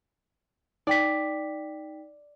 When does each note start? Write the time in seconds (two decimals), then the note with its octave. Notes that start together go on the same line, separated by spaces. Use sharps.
0.87 D#4 D5 G5 B6